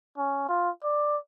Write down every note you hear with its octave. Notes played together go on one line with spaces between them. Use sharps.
C#4
F4
D5